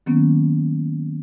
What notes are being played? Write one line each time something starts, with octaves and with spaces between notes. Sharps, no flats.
D#3 F#3 A#3 B3 C#4